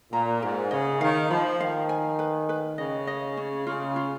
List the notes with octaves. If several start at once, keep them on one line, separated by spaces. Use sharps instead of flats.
A#2 A#5
G#2 A#4
C#3 D#5
D#3 F5
F3 B5
D#3 F5
G#5
B4
B4
C#3 D#5
D#5
C#4
C#3 F4
F4